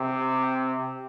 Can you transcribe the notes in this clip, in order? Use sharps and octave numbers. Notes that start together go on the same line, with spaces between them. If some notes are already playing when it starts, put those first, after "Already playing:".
Already playing: C3